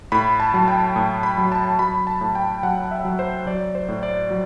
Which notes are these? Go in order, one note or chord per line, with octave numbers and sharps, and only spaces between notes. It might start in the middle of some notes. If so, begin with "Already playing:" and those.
A2 B5
A5
F#3
G5
A2
B5
F#3
A5
F#3 B5
A5
A2
G5
F#3 F#5
E5
F#3
C5
F#3 D5
C5
A2
D5
F#3